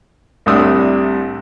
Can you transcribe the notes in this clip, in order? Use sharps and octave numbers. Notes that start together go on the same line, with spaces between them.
C2 A2 C3 D4 D#6 E6